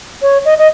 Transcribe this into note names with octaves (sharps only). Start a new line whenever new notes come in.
C#5
D#5
D#5